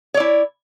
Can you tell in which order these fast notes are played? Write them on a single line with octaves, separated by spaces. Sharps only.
C#5 D5 E4